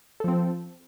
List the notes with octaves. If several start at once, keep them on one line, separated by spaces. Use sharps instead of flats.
F3 C4 A4